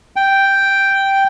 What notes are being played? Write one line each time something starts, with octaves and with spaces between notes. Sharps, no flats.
G5